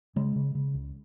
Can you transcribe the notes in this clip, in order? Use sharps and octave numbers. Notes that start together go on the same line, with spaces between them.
C#3 G#3
C#3
C#3
C#2